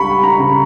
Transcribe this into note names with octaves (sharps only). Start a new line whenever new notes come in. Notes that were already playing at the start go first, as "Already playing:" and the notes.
Already playing: C#2 G3 B5 C#6
A#5
C#3